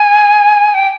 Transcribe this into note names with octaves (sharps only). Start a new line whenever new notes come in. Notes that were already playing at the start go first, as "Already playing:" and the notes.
Already playing: G#5
G5